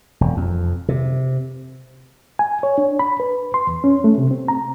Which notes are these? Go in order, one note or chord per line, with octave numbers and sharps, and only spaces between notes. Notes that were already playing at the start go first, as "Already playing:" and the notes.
E1
F2
C3
G#5
C#5
D4
B5
B4
C6
E2
C#4
A3
C3
C4
A#5